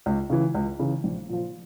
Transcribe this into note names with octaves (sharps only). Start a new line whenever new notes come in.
C#2
C#3 E3
C#2
C#3 E3
A#1
A#2 F3